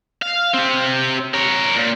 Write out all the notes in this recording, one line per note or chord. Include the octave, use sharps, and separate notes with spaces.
F5
C4 G4
A#4 C#5
A#2